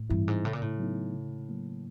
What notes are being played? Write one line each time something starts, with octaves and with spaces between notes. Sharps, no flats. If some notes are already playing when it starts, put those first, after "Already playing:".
Already playing: A2
G2 E3 G3 C4 E4
G#2
A2 C#3
A#2
A2
F#3 B3 D#4
C#3
F#3 A#3